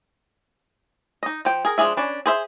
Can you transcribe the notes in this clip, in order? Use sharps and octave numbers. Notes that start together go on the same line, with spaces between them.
D#4 D#5
F3 G5
G#4 A#4
F3 G#3 D4 G#4 E5
C#4 D4 B4
G#4 C5 E5